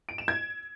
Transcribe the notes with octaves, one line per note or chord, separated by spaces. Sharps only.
D7
E7
G#6